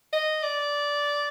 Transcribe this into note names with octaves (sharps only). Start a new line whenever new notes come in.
D#5
D5